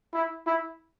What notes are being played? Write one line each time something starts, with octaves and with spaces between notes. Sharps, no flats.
E4
E4